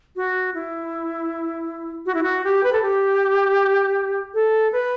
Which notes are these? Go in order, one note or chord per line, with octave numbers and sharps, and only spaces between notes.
F#4
E4
F#4
E4
F#4
G4
B4
A4
G4
A4
B4